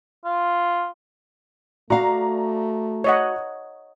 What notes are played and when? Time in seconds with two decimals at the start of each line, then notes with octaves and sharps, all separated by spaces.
0.25 F4
1.90 A3 F#4 D5 F5 A#5
3.04 C#5 D#5 F#5